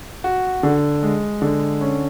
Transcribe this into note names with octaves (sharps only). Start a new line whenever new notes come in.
F#4
D3
G#3
D3
C#4